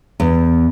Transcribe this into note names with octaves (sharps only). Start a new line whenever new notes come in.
E2